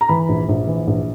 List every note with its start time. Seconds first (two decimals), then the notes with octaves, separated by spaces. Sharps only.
0.01 A#5
0.09 E3 B5
0.29 A#1
0.49 A#1
0.67 E3
0.87 A#1